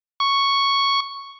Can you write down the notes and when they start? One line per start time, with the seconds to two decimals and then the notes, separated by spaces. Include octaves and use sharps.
0.20 C#6